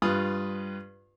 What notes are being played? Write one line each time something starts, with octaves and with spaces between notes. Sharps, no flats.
G2 F4 B4 D#6